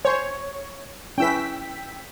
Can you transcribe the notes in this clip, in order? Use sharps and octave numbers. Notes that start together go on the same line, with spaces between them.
C5 C#5 G#5 C6
C#4 E4 B4 G5 E6 B6